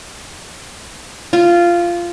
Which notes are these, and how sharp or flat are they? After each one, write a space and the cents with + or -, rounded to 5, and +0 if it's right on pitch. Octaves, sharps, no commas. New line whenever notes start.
F4 -10